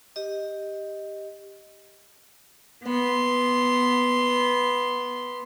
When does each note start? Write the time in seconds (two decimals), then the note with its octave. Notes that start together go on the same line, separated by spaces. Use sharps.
0.16 G4 D#5
2.84 B3 C6